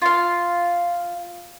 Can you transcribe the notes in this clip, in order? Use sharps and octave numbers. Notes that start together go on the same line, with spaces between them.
F4 F5